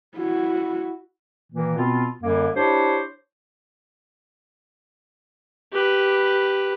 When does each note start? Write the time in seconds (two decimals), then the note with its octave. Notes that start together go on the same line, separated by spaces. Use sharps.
0.16 E4 F#4
1.53 A#2 D#3 E3 A#3
1.77 B2 B3 C4 F4
2.23 F#2 D3 G3 A#3
2.57 D4 E4 G4 C5 C#5
5.72 G4 B4